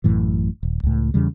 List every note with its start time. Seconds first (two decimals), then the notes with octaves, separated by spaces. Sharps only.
0.04 A1 F#2 A2 E3
0.63 D#1
0.83 C#2 A2
1.14 E2 C#3 G3